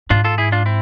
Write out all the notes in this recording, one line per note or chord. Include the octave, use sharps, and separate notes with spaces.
G#2 D4 F4
F4 A4
E4 G#4
D4 F4
C4 E4